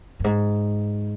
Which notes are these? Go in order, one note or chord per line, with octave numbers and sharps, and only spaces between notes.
F#2
G#2